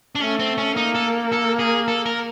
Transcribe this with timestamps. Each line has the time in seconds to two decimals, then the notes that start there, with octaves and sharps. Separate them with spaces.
0.15 D4
0.21 A3 C#4
0.39 C4
0.58 C#4
0.76 A#3 D#4
0.95 A4
1.32 A4
1.59 G#4
1.88 A4
2.06 A#4